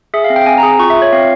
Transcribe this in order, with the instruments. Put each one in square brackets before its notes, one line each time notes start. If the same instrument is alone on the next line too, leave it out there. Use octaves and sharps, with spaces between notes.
[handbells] G#4 E5
F5
C4
G5
C4 G#5
A#5
G#4
F4 C#6
E5
F4
C#5
C4 F5